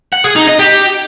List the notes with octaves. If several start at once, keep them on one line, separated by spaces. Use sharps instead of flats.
F#5
G#4
D#4
D#5
G4